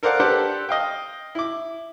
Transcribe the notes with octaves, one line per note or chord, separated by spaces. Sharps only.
A4 A#4 C5 D5 F5 F#5
D4 G4 A4 B4 C5 F#5
D#5 F5 G5
E4 D6